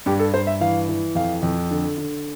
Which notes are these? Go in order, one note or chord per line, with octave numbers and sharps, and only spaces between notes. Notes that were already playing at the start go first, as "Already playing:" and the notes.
G2 G4
A4
G2 C5
E5
E3 F5
E3
F2 F5
F2
D3
D3